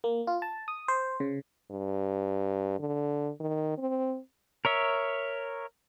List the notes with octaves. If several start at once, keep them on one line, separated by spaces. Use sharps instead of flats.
A#3
F4
A5
D#6
C5
C#3
G2
D3
D#3
C4
A#4 C#5 E5